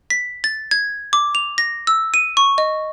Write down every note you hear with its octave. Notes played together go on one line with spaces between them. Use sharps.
B6
A6
G#6
D6
F7
A#6
E6
D#7
C#6
D#5